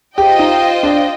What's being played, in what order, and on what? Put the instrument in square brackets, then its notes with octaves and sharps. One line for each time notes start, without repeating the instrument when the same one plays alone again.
[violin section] F4 C5 D#5 G5 [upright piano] G4
[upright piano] D#4
D4